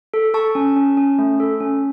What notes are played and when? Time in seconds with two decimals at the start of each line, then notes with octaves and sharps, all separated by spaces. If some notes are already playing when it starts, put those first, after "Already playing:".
0.14 A4
0.34 A4 A5 C#6
0.55 C#4
0.76 C#4
0.97 C#4
1.19 A3
1.40 A4
1.60 C#4